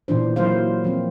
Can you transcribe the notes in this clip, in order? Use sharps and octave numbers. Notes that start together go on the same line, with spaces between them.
A#2 E3 D4 C5
F#3 A#3 E4 C5 F5
F3 A#3 C4